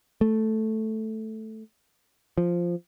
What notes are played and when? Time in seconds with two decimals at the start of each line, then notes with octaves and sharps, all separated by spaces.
0.21 A3
2.38 F3